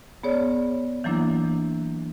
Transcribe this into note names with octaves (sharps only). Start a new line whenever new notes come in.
B3 G#4 C#5 D5
E3 F#3 A#3 D4 E4